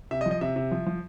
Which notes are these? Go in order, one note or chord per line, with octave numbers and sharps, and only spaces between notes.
C3 E5
D#5
F3
D#5
C3 E5
C3
F3
F3